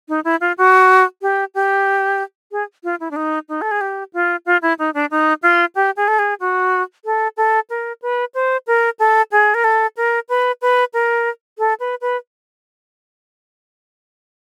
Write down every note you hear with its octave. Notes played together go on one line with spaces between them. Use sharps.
D#4
E4
F4
F#4
G4
G4
G#4
F4
E4
D4
D#4
D#4
A4
G#4
G4
F4
F4
E4
D#4
D4
D#4
F4
G4
G#4
A4
G#4
F#4
A4
A4
A#4
B4
C5
A#4
A4
G#4
A#4
A4
A#4
B4
B4
A#4
A4
B4
B4